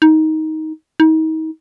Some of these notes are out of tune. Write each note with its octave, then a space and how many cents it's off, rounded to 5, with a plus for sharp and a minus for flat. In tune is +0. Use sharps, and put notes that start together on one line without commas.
D#4 +15
D#4 +35